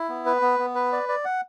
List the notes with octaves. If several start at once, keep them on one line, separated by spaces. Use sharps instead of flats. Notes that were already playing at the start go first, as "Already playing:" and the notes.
Already playing: E4
B3
B4
B3
B3
B4
D5
D5
F#5